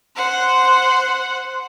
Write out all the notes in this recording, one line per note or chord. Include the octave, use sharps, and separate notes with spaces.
C5 F#5